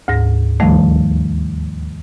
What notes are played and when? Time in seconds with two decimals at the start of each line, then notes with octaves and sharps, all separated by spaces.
0.08 D2 G#2 A#6
0.60 D#2 D#3 F3 G3 A3